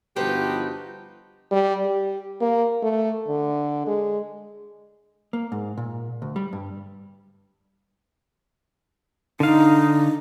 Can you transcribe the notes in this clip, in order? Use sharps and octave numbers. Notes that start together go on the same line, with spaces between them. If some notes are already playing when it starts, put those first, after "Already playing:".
G1 F3 D#4 F#4 G4 A4 B4 C5
G3
G4
A#3
A3
D3
G#3
A#3
G#2
A#2
D2
G3
G2
D3 D#4 F5